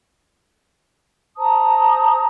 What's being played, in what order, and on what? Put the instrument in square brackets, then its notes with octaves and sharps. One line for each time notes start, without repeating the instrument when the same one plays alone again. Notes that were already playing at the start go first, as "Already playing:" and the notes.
[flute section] C5 A5 A#5 D#6